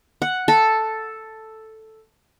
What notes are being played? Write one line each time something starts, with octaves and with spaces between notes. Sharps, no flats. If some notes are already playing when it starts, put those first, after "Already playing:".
F#5
A4